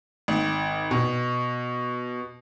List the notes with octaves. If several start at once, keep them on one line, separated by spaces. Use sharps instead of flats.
G#1
B2